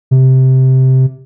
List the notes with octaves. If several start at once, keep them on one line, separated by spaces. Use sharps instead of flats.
C3